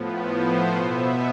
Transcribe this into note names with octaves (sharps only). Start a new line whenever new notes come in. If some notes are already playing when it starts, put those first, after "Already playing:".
Already playing: A2 F3 B3
C5
B2 B3 E5